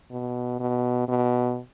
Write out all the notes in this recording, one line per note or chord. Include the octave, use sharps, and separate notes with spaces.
B2
B2
B2